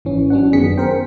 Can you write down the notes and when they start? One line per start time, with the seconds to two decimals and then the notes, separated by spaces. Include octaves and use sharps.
0.05 G#1 E3 C#4
0.30 F#3 C#4 D4 F#5
0.53 F#2 D#3 B3 G#4 B6 C#7
0.78 A#4 C5 G5